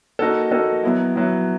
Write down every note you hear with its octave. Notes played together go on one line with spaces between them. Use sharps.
A#3 D#4 F#4 A4
A#3 D#4 F#4 A4
F#3 B3 E4
F#3 B3 E4